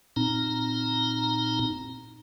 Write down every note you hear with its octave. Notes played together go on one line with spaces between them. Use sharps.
A#2 C4 D#4 A#5